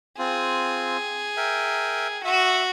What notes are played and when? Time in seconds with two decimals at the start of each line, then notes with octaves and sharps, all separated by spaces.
0.19 C4 F4 G#4
1.37 A#4 E5 G5
2.25 F#4 E5